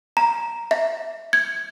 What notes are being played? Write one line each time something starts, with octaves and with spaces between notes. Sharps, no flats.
A#5
E5
G#6